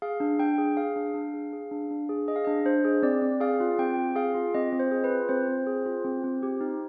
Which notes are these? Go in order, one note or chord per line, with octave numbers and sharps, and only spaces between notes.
G#4 F5
D4
D4 G5
G#4
G#4 F5
D4
D4
G#4
G#4
D4
D4
G#4
G#4 D#5
F5
D4 D#5
D4 C5
G#4
C4 D5
C4
G#4 F5
F4
C4 G5
C4
G#4 F5
F4
C4 D#5
C4
C5
G#4
B4
F4
C4 C5
C4
G#4
F4
C4
C4
G4
D#4